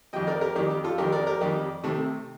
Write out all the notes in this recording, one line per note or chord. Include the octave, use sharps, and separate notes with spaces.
F2 D#3 G3 D#5 G5
A#4 D5
G4 A#4
F2 D#3 G3 G4
G4
F4 A4
F2 D#3 G3 G4 A#4
A#4 D5
G4 A#4
F2 D#3 G3 G4
C3 D#3 A3